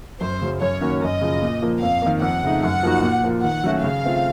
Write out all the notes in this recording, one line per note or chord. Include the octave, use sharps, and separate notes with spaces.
F#2 C5
C#3 F#3
F#2 C#5
D#3 A#3 C#4 F#4
F#2 D#5
C#3 F3
A#2
F3 A#3
F2 F5
D#3 A#3
F2 F#5
C#3 A3 D#4
F#2 F#5
F3 A#3 D#4 F#4
A#2
F3 A#3 F4
D#3 F#5
F#3 A3 C#4 F#4
C#3 F5
A3 C4 F4